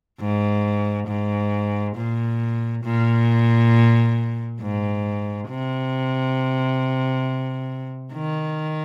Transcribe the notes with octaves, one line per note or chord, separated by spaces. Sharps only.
G#2
G#2
A#2
A#2
G#2
C3
D#3